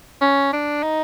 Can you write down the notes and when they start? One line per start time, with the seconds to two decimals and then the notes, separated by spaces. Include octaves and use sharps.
0.22 C#4
0.53 D4
0.83 D#4